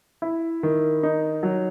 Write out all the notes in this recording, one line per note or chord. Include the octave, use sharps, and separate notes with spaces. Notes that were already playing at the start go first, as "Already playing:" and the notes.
E4
D#3
D#4
F#3